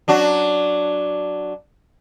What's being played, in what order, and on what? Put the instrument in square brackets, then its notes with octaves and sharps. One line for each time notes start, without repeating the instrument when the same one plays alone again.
[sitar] F#3 D4 F#4